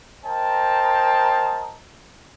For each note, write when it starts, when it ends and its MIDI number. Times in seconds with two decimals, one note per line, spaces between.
0.25 1.76 70
0.25 1.76 72
0.25 1.76 75
0.25 1.76 79
0.25 1.76 81
0.25 1.76 82